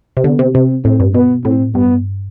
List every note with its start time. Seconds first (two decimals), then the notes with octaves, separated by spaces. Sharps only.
0.17 C3
0.24 D3 B3
0.39 C3
0.55 C3 C4
0.84 A2 C4
1.00 G2
1.14 B2 B3
1.44 A2 C4
1.75 G2 B3